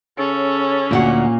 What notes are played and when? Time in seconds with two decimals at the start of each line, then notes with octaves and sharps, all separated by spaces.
0.18 C#3 C#4 A4
0.91 D2 A#2 F#4 F#5